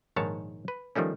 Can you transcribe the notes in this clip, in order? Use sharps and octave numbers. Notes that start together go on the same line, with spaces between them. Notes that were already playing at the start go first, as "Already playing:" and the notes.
A#1 G#2 D#3 C#5 A5
B4
D#3 F3 G3 A3 C#4